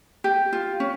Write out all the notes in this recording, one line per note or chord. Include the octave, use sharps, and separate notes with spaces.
G4
F4
C#4